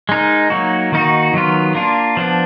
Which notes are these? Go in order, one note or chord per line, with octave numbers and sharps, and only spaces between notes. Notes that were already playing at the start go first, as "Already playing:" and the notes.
G#3 D#4 A#4
F#3 A#3 D#4 F#4
D#3 A#3 D#4 F#4
D#3 F#3 B3 F4
A#3 D4 F4
F3 B3 D4